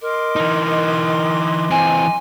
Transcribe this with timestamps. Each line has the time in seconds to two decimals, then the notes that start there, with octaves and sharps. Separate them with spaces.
0.01 A#4 D#5 C6 D6
0.36 E3 D#4
1.70 E3 C4 G#5